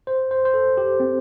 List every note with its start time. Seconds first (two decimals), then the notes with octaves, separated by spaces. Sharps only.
0.07 C5
0.31 C5
0.45 C5
0.54 A4
0.77 G4
1.00 C4